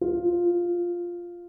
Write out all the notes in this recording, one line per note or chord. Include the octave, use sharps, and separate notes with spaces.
F4